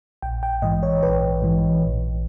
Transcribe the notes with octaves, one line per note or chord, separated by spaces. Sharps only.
A#1 G5
G5
G#2 E3 D#5
C#5
A#1 B4
G#2 E3
A#1